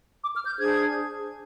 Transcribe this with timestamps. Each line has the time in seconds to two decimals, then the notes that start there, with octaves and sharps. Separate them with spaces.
0.22 D6
0.34 F6
0.46 G6
0.58 D4 G#4 C5 G#6